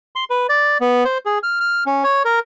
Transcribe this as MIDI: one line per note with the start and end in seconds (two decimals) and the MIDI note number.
0.16 0.24 84
0.30 0.47 71
0.49 0.78 74
0.81 1.04 59
1.05 1.18 72
1.26 1.38 68
1.43 1.59 89
1.60 1.84 89
1.86 2.04 61
2.04 2.23 73
2.25 2.39 70